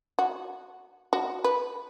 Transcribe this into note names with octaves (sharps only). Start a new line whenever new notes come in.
F#4
F#4
B4